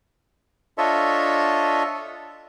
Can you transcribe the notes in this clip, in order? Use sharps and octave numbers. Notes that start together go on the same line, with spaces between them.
D4 F4 A4 C#5 D#5 E5